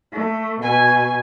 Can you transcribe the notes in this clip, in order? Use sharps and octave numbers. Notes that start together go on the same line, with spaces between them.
A3
B2 G#5